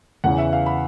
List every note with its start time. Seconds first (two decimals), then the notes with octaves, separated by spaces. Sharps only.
0.24 E2 C#3 E3 F#5
0.38 E5
0.53 F5
0.66 B5